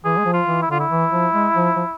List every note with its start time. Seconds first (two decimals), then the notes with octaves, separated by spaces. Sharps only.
0.04 E3 G#4
0.18 G#3
0.25 F3
0.33 F4
0.47 E3
0.62 E4
0.69 D3 F4
0.80 E4
0.90 E3
1.12 F3
1.33 G#3
1.55 F3
1.76 F3